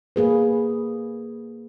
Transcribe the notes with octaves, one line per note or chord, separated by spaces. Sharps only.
A#3 G#4 B4